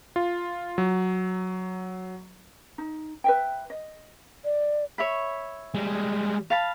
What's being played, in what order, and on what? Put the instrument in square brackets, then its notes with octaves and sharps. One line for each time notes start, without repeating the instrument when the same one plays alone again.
[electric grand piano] F4
F#3
[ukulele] D#4
B4 E5 G5
D#5
[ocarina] D5
[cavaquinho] C#5 E5 B5
[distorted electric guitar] G3 G#3
[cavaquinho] F5 A5 B5